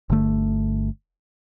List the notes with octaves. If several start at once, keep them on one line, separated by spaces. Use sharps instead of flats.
G1 D3 A3